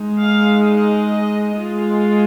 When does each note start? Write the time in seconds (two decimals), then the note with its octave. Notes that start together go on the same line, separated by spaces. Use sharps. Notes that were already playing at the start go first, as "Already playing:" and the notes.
Already playing: G#3 D#4
0.19 F5
0.65 D#5
1.56 G#3 F4